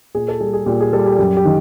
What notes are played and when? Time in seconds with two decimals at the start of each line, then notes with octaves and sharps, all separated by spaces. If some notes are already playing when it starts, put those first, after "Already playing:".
0.15 A#2 G#4
0.28 A4
0.40 G3 G#4
0.53 G#4
0.66 A#2 G4
0.80 G#4
0.93 G3 A4
1.06 G4
1.19 F#2 G4
1.37 G4
1.45 D#3